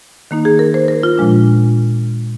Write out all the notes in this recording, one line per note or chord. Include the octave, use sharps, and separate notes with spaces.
D#3 A#3 D#4
G#4
A#4
C5
A#4
F4
A#2 F3 G#3 D4